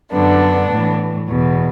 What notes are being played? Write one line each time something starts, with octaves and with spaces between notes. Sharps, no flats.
F#2 D3 B3 D4
A2 E3
E2 B2